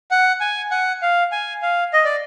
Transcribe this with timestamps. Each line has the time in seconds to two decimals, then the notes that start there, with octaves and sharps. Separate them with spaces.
0.11 F#5
0.40 G#5
0.71 F#5
1.02 F5
1.32 G#5
1.62 F5
1.93 D#5
2.05 D5